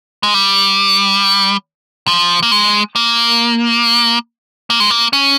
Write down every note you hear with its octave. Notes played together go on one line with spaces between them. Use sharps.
G#3
G3
F3
A#3
G#3
A#3
A#3
G#3
A#3
C#4